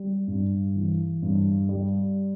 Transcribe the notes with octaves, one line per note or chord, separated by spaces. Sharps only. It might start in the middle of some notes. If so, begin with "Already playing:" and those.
Already playing: G3
G2
E3
G2
G3